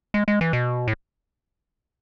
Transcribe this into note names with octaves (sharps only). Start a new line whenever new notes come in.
G#3
G#3
E3
B2
A2